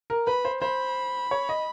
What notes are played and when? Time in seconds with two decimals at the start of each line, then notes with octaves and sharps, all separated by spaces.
0.10 A#4
0.27 B4 B5
0.45 C5
0.61 C5 B5
1.31 C#5
1.49 D#5